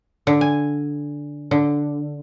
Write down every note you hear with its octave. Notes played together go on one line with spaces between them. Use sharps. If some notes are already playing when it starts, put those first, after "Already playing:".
D3
G#5
D3